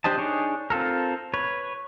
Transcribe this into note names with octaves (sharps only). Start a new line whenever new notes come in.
D4 G4 C5 D#5 A5
D4 D#4 G#4 C#5
C4 F4 A4 A#4
B4 C#5